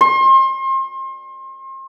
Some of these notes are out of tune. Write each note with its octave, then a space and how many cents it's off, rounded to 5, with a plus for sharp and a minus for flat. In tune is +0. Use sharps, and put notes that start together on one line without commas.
C6 +35